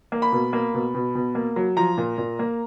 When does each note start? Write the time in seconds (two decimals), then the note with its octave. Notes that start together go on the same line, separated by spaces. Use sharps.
0.12 A#3
0.22 B5
0.32 B2
0.53 A#3
0.74 B2
0.95 B2
1.15 B2
1.35 A#3
1.56 F#3
1.77 F3 A#5
1.98 A#2
2.18 A#2
2.39 A#3